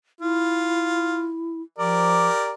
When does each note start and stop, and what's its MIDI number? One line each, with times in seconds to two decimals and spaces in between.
0.21 1.61 64
0.21 1.30 65
1.78 2.28 53
1.78 2.53 67
1.78 2.53 70
1.78 2.53 74